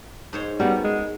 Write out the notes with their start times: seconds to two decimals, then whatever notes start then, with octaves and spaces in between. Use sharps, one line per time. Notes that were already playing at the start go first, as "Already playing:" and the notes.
0.33 G#2 C5 C#5
0.60 G3 B3 C#4 F#4 A#4
0.84 G#3